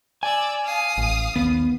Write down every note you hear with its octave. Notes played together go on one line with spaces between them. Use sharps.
D5 G#5 E6
F5 D#6
A1
D#2 B3